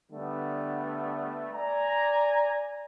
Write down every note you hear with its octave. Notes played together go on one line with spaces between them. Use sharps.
D3 G3 A3 B3
D5 G#5 A#5